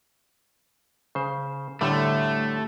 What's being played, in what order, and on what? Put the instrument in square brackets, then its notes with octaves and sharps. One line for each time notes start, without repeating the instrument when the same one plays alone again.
[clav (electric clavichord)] C#3 C5
[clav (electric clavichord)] A2 D3 G3 [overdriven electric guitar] A3